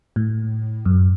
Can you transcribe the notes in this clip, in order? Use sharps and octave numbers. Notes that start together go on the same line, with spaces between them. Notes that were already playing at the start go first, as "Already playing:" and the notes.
A2
F#2